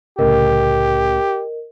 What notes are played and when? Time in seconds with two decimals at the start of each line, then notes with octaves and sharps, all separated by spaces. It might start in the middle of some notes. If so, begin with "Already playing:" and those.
0.19 C2 A2 C#3 G4 A#4 D#5